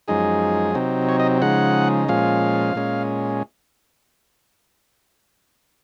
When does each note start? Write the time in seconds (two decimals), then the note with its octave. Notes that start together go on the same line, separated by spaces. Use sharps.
0.08 F#2 F3 G#3 D#4 G#4
0.75 C3 F#3 C4 D#4
1.09 C#5
1.20 D#5
1.42 C#3 F3 G#3 D#4 F#5
2.08 A#2 F3 G#3 C#4 F5
2.75 A#2 G#3 C#4